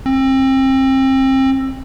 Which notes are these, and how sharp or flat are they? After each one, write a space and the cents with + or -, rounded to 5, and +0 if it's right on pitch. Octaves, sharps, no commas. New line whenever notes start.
C4 +30